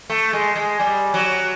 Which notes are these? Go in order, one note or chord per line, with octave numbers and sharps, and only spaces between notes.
A3
G#3
G#3
G3
F#3